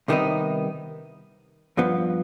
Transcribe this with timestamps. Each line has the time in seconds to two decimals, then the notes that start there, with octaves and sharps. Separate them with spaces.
0.08 C2 C3 D#3 B3 D#4
1.77 G2 F3 B3